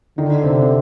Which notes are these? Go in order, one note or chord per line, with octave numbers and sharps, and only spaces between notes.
D3 D#3 D#4
C3 C4
C4